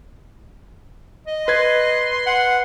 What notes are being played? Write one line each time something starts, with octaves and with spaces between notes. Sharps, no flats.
D#5
B4 C6 G#6
F#5